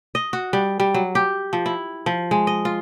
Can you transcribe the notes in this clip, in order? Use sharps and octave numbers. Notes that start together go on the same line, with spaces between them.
D#5
F#4
G3
G3
F#3
G4
F3
E4
F3
G#3
D#5
F4